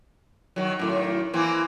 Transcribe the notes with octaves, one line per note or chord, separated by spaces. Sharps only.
D#3 F#3
F#2 A2 D#3
E3 A#3 C4